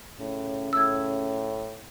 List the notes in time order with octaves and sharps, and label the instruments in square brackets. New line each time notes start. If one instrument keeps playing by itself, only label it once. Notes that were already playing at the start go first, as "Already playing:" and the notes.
[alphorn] A2 [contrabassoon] C#3
[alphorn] A2 [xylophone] E6 G#6